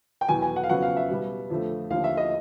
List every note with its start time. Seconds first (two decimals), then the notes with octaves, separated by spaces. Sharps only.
0.21 G5
0.29 E2 B2 F#3 B3 G#5
0.42 G#5
0.56 F#5
0.63 F5
0.69 F2 C#3 F#3 B3 F#5
0.83 F5
0.97 E5
1.10 B2 G3 B3
1.50 F2 D3 F3 A3
1.90 D#2 D3 F3 F5
2.04 E5
2.17 D#5